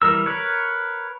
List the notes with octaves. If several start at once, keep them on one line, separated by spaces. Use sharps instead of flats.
E3 G3 A#4 E6
A#4 B4 C#5